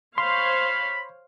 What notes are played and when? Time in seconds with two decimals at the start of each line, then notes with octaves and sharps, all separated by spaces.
0.18 C5 C#5 F5 B5 C6